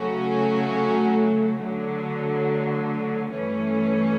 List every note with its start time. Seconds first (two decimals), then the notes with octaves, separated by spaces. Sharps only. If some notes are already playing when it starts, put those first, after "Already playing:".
Already playing: C#3 F#3 A3 C#4 F#4
1.58 D3 F#3 A3
3.30 G2 E3 A3 C#4